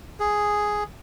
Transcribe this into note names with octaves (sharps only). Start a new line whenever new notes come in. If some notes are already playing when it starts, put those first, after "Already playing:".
G#4